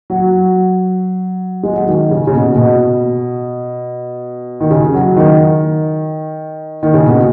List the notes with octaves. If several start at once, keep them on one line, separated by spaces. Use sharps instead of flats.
F#3
G#3
F#3
D#3
C#3
C#3
B2
B2
D#3
C#3
F#3
D#3
D#3
C#3
B2